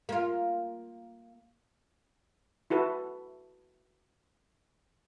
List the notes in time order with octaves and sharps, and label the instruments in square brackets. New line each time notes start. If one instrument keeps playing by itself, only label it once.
[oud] A#3 F4
[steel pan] E4 F#4 A4 B4